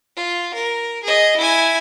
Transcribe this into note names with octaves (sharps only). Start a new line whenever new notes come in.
F4
A#4
G#4 D#5
E4 G#5